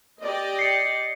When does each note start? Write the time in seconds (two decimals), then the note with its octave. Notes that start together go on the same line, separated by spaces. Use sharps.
0.20 G4 D5 D#5
0.59 C7 C#7